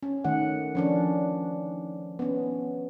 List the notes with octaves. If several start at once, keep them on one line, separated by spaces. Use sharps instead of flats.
C#4
D#3 A3 F#5
F3 C#4 D4
B3 C#4